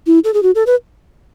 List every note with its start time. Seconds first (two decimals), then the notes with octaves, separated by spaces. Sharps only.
0.07 E4
0.24 A4
0.34 G#4
0.43 F#4
0.55 A4
0.66 B4